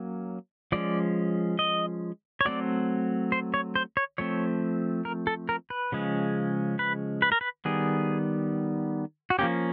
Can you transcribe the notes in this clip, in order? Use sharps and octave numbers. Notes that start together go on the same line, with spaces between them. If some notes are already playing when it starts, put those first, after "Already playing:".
Already playing: F#3 A#3 C#4
F3 G#3 C#4 D5
D#5
C#5
F#3 A3 C4 D5
C5
C#5
C5
C#5
F3 A3 C4 C#5
A#4
A4
A#4
B4
C#3 F3 G#3 C#4
B4
B4
A#4
B4
D#3 G3 B3 G#4
F#4
F3 A#3 C#4 G4